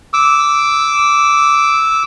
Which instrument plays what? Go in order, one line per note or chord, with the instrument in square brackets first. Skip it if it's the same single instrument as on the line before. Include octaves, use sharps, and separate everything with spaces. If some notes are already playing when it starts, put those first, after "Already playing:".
[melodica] D6 E6